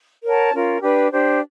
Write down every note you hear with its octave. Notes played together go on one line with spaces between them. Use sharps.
A#4 C#5 F#5 A5
C#4 F4 A#4
D4 G4 B4
D4 G4 C5